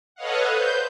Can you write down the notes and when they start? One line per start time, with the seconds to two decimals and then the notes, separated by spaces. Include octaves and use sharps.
0.15 A4 B4 C#5 D#5 F5 F#5
0.52 B4 C5 G6